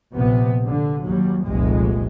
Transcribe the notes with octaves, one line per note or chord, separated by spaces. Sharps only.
A#1 C3 B3
D3
D#2 F#3 G3
F1 C2 F2 A#2 G#3